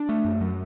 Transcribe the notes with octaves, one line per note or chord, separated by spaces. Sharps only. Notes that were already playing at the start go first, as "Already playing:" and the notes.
Already playing: D4
A3
F#2
F#3